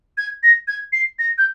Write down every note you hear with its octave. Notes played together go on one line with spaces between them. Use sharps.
G#6
A#6
G#6
C7
A#6
G6